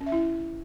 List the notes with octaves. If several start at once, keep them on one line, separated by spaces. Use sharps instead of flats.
C#4
E5
E4